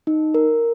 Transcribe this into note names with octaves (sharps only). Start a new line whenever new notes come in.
D#4
A#4